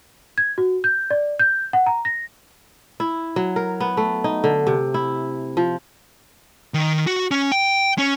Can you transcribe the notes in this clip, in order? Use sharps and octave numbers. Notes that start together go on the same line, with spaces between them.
G#6
F#4
G6
D5
G6
F#5
A#5
A#6
E4
F#3
A#4
B3
A3
D#4
D3
C3
E4
F3
D#3
F#4
C#4
G5
C#4